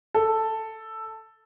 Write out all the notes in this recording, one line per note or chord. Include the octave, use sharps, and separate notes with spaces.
A4